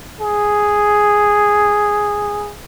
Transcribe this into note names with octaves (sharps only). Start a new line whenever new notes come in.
G#4